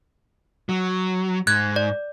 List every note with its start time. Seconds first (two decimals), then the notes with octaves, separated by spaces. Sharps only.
0.69 F#3
1.47 G#2 F#6 G#6
1.76 D5